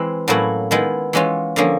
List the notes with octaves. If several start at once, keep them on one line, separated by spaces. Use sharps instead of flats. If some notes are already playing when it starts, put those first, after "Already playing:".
Already playing: E3 G#3 C4 E4
A2 F#3 A#3 C#4 E4
D#3 G#3 B3 E4
E3 G#3 C#4 F4
D3 F3 A#3 C#4